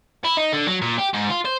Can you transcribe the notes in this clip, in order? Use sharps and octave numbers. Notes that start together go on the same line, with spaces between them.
E4
D#4
D3
F#3
A#2
G4
G#2
F4
C5